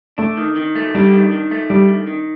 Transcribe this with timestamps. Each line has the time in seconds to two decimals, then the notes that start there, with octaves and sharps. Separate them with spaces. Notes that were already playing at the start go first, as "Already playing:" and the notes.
0.18 A3 D4
0.37 D#3
0.56 D#3
0.75 A3
0.95 G3 D4
1.12 D#3
1.32 D#3
1.51 A3
1.70 G3 D4
1.89 D#3
2.07 D#3